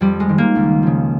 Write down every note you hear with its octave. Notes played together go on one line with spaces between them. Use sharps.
F2 G3
G#3
D#3
A#3
C#2
C#3 F3